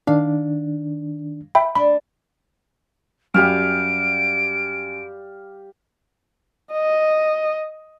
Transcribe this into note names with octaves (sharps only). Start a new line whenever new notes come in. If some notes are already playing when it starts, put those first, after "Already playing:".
D#3 D4 F5
E5 G5 B5
D4 B5
F#2 G3 G4 F5 D7
D#5